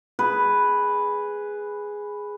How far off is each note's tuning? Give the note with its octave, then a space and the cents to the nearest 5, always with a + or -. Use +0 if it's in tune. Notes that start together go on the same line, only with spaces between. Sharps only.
G#4 +0 B4 +0